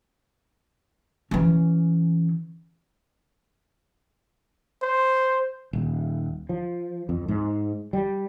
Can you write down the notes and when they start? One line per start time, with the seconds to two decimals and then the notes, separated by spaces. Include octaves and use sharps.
1.31 E3 C#4
4.82 C5
5.73 D#1
6.49 F3
7.09 F2
7.28 G#2
7.93 G3